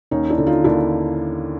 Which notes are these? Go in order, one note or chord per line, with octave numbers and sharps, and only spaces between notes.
D#2 C#4 D#4
D4 E4
D3
D#4 F4
D#2 D4 E4